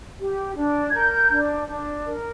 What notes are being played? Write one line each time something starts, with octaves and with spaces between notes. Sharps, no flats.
G4
D4
G#6
A#4 G6
D4
D4
A#4